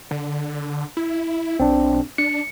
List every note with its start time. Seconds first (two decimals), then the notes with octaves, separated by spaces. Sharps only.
0.11 D3
0.97 E4
1.60 B1 C4 D4
2.18 D4 C#7